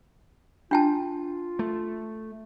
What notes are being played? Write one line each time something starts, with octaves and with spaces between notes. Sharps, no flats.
D4 F4 G5 A5
A3